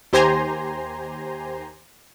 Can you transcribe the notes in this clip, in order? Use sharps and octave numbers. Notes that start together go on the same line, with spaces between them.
D#2 G4 C5 G#5 A#5 C6